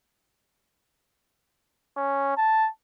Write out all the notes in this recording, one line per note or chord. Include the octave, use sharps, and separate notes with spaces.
C#4
A5